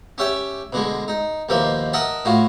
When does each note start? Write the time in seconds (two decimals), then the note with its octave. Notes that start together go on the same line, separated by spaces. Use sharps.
0.18 C#4 G4 C#5 E5 G5
0.73 B2 D3 G#3
1.08 D#4
1.49 D#2 B2 F3 A#3 E5
1.93 A#4 D#5 E5 F#5 A5
2.25 A2 F4 F#4